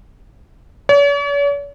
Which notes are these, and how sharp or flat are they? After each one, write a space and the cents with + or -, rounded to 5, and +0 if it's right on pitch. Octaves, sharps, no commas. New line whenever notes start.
C#5 +45